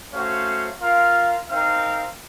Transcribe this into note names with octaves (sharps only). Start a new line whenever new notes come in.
A3 C#4 F#4 C5 F5
F4 A#4 F5
C4 D#4 A#4 F5